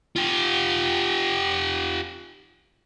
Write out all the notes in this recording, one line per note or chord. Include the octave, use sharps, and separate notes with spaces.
F4 G4